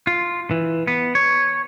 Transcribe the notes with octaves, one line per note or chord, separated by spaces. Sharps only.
F4
E3
B3
C#5